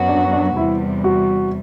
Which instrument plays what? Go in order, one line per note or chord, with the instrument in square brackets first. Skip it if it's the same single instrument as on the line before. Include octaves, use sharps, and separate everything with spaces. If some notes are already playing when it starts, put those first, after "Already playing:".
Already playing: [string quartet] F#2 F#3 B3 F#4
[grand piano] D4
D4
[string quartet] E2 C3 G3 [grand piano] E4
[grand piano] F#4